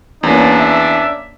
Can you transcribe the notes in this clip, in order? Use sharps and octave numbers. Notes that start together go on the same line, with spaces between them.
E2 A#3 C#4 D4
E5